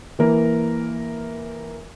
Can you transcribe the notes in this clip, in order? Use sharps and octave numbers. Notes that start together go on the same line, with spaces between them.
E3 A#3 A#4